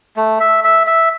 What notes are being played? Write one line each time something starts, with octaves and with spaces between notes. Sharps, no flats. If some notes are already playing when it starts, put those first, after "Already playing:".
A3
E5
E5
E5